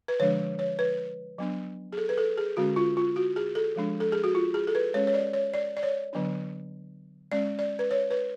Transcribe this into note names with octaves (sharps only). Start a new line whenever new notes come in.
B4
D3 F3 G#3 D4 C#5
C#5
B4
F#3 B3 D4
G#4
A4
B4
A4
G#4
D3 G#3 C#4 F#4
F4
F4
F#4
G#4
A4
F3 G#3 D4
A4
G#4
F#4
F4
G#4
A4
B4
G#3 C#4 C#5
C#5
D5
C#5
D5
D5
C#5
D3 F#3 B3 D4
G#3 C#4 D5
D5
B4
C#5
B4